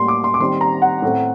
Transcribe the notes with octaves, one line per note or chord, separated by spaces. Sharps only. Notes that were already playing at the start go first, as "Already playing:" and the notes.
Already playing: A2 G3 A#3 C6
D6
C6
D6
D#3 G3 C4 C6
A#5
F#5
A2 A3 C4